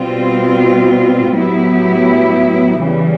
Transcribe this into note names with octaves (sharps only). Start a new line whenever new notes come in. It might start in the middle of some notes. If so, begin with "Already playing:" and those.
Already playing: B2 G3 C4 F4
A2 F#3 B3 E4 G4
E2 C#3 E3 G3